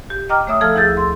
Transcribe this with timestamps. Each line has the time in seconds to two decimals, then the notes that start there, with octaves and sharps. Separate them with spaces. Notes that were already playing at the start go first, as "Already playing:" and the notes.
0.10 G4
0.29 D#5 G5 A#5 D6 F6
0.47 A3 C#5 E5 D#6 E6
0.61 F3 A4 A5 E6 F6
0.75 D2 E4 G#4 E6 G6 A6
0.97 C6